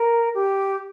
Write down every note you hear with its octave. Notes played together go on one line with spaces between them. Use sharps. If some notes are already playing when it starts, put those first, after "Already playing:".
Already playing: A#4
G4